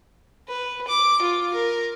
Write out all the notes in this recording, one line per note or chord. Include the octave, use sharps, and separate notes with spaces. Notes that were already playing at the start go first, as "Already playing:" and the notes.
B4
D6
F4
A#4